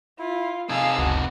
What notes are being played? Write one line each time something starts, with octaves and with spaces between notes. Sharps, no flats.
E4 F4
C3 D#4 G#4 A4 F5 G#5 E6
F#1 C#2 F#4